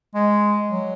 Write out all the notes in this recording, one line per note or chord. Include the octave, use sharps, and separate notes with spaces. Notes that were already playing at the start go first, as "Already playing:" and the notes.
G#3
F#3